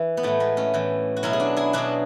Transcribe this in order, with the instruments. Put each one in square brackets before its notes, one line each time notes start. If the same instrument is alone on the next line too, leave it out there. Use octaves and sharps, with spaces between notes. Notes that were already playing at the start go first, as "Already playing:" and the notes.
Already playing: [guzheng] E3
B3
A2 E3 A3
G#3 B3
A3 C#4
A2 E3
F#4
B2 F#3 C#4 E4
G#4
D4 F#4
E4 G#4
B2 F#3 D4 F#4